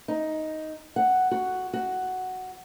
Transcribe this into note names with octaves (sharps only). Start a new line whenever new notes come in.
D#4
F#5
F#4
F#4